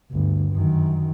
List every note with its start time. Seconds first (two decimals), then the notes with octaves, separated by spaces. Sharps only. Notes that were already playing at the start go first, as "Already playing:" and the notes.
0.11 G1 D2
0.52 F#2 D#3